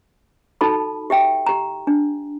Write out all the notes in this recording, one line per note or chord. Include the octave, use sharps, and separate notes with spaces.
D#4 F#4 A4 A5 B5
G4 E5 G5
G4 A#5
D4